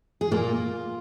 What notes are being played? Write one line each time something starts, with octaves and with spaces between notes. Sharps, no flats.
G#4
A#2 A#3 F4